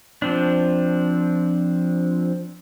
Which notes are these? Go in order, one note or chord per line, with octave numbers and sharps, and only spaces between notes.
F3 C4 D4